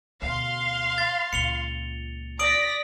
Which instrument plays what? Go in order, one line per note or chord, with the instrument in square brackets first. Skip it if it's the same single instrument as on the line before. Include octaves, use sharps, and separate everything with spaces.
[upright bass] D2 B2 [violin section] F5 C6
[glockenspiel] A6
[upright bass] C#2 A#2 [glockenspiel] C#7 F7 G7
[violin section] D5 A#6 B6 [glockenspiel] D#6 D7 F#7